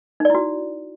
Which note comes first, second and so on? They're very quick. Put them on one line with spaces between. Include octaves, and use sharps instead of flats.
D#4 D5 E4 F#4